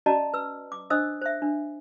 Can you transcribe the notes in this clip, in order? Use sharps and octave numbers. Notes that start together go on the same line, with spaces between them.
C#4 F#4 D5 D#5 A5 A#5
B4 E6
D6
D4 C5 D#5 D#6 E6
C5 E5
D4